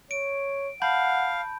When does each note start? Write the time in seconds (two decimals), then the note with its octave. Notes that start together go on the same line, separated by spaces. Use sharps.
0.11 C#5 D7
0.82 F5 F#5 A5 B5 G6